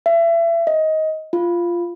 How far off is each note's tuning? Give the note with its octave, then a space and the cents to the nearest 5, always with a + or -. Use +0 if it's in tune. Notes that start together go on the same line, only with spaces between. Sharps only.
E5 +30
D#5 +15
F4 -10